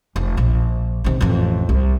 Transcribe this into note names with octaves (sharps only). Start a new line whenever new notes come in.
F1
A#1
C3 D#3
A1 F2
C2